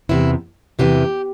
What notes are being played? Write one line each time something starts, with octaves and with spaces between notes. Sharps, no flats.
E2 C3 E3 E4
E2 C3 E3 G4